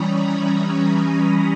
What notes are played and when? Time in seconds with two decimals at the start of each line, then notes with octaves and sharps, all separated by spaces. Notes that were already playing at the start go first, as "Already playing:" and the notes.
Already playing: E3 G3 C#4 A#5 B5 C#6 D#6
0.22 A#5 C#6